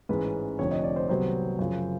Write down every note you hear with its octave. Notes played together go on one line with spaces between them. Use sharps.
A1 G#2 E3 G#3 C#4 B4
F1 F2 D3 C#5
D#5
D5
C5
C2 C3 D#3 F#3 B3 C5
F#2 C#3 F3